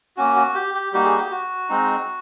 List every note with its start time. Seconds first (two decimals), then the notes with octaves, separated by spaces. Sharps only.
0.17 A#3 C#4 F#4
0.36 F#4
0.55 G4
0.74 G4
0.93 G3 A#3 D#4 F#4 G4
1.05 G#4
1.16 G4
1.31 F#4
1.69 G#3 C4 D#4